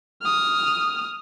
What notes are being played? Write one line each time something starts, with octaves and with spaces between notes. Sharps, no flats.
D#6 F6